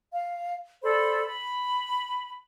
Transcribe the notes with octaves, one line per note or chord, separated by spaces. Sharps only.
F5
A4 C5 D5 B5
B5